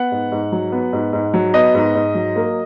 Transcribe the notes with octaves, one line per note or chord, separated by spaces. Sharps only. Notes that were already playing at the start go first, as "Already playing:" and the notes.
Already playing: B3 F#5
G#2
G#2
F#3
B3
G#2
G#2
F#3
B3 D#5
G#2
G#2
F#3
A#3